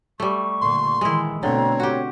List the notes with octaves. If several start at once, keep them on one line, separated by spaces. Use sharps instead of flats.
G3 A3 C#6
A#2 D3 C6
D#3 E3 G#3 E4
B2 D3 A3 C4 C#5 A#5
F#4 G4